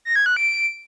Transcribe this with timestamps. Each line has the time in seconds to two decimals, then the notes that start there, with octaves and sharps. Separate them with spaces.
0.05 A#6
0.16 G#6
0.26 F#6
0.37 D7